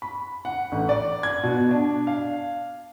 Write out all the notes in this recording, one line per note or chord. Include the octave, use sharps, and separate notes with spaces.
B5
F#5
A1
D5
G#6
B2
D4
F5